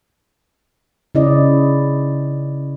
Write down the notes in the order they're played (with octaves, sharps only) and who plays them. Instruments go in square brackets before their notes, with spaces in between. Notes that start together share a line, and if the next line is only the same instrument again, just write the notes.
[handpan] C#3 C#4 E4 D5 D#5